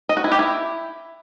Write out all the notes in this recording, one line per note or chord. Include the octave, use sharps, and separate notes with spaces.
D#5
F#4
E4
G4
E4